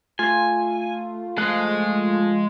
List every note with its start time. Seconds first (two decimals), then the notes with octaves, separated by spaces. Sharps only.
0.19 A3 F4 G#5
1.38 F3 G#3 A3 F5 F#6